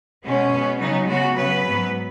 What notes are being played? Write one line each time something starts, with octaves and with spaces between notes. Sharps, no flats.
B2 G#3 B3 C#4
B2 B3
C#3 F#3 B3 D#4
C#3 G#3 B3 F#4
C#3 F#3 B3 B4
G#2 F#3 B3